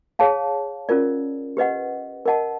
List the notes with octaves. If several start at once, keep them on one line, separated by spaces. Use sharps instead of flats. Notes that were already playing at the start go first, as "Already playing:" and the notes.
G#4 C#5 F5 A5
C#4 F4 A#4 D5
G4 B4 D#5 F#5
A#4 D#5 F#5 A5